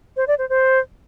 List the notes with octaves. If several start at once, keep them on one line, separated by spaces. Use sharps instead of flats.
C5
D5
C5
C5